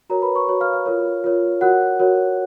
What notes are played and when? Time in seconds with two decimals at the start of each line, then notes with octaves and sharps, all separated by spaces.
0.10 F#4 A#4 C#5 A#5
0.22 B4 B5
0.35 C#5 C#6
0.48 F#4 C#5
0.61 F5 F6
0.73 F5 F6
0.86 F4 A#4 C#5
1.24 F4 A#4 C#5
1.61 F#4 A#4 C#5 F#5 F#6
2.00 F#4 A#4 C#5